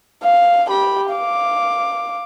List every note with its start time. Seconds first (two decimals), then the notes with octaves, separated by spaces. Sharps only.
0.23 F5
0.68 G4 B5
1.12 F5 D6